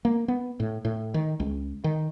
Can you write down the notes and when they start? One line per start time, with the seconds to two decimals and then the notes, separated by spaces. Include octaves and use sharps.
0.05 A#3
0.28 B3
0.60 A2
0.85 A2
1.14 D#3
1.40 C#2
1.84 D#3